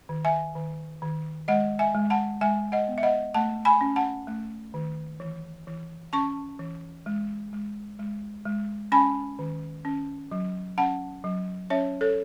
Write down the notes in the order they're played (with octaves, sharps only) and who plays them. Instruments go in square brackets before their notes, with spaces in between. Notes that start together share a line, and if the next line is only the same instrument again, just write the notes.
[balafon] D#3
E5 G#5
D#3
D#3
G#3 D#5 F#5
E5 G#5
G#3
F#5 A5
G#3 E5 G#5
D#5 F#5
B3
E5
D#5 F#5
A3 F#5 A5
G#5 B5
C#4
F#5 A5
A3
D#3
E3
E3
C#4 A5 C#6
E3
G#3
G#3
G#3
G#3
C#4 G#5 B5
D#3
C#4
F#3
C#4 F#5 A5
F#3
C#4 C#5 E5
A4 C#5